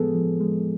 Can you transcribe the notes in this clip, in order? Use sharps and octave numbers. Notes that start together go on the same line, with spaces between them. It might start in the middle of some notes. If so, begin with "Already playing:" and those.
Already playing: A2 F3 G#3 B3 G#4 A4
F3
G#3